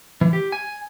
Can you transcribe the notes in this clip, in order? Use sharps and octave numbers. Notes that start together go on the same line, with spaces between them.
E3
G4
G#5